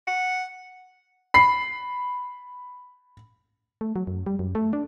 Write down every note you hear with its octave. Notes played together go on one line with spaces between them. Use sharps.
F#5
B5 C7
A3
F#3
F#2
G3
F#2
A3
D4